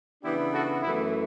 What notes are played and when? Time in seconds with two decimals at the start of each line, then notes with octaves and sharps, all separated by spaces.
0.23 C#3 E3 B3 D4 E4 G4
0.53 F#4 A4
0.82 F#2 E3 A3 E4